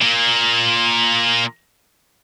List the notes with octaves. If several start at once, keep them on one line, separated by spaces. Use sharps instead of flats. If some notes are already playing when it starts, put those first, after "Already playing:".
A#2 A#3